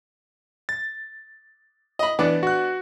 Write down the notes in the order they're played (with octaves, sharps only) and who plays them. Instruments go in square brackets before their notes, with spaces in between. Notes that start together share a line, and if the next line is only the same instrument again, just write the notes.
[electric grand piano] A6
[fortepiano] D#5 B5
[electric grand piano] E3 [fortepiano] B3 D4 D5
[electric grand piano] F#4 F#6